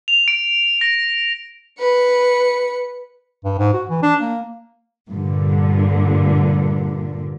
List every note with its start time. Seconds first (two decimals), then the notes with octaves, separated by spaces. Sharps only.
0.08 F7
0.28 D7
0.81 A#6
1.79 B4 C#7
3.44 G2
3.58 G#2
3.73 F#4
3.89 E3
4.02 D4
4.21 A#3
5.09 G2 A#2 D3